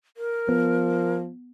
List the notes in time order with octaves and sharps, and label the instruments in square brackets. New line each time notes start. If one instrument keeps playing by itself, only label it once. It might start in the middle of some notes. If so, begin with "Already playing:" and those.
[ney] A#4
[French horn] F3 [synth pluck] B3